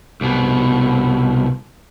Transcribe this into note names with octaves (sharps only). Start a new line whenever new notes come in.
C2 B2